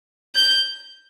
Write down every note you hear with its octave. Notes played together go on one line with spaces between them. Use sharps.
G6